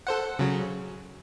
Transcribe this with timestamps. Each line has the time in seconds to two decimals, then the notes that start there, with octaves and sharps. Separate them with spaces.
0.07 A4 C5 F#5
0.39 C#3 F#3